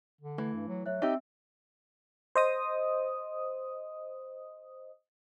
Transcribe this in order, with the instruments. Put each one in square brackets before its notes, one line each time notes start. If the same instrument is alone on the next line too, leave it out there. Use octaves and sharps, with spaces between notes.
[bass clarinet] D3
[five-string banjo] E3 [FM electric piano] A3
[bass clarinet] G2
F#3
[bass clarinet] F#3 [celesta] C#5 E5 F#6
[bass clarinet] C4 [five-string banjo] D#4 G4 [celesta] E5 E6
[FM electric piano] C5 D#5 D#6